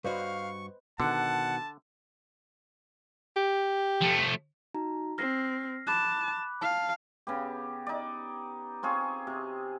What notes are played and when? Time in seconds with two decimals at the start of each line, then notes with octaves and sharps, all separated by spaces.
0.05 G2 F#4 B4 C5 D#5 F5 C#6
1.00 B2 D3 D#3 F#5 A5
3.36 G4
4.01 F3 A3
4.74 D#4 F#4 A#5
5.18 C4 F6 A#6 C7
5.87 A5 B5 D6 F#6
6.61 F5 A5
7.27 C#3 B3 G4
7.87 D#4 D5
8.83 C4 F4 G#4 C#5
9.27 C3